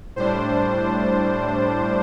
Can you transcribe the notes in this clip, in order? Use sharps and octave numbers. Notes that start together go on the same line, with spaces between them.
A2 G3 D4 C5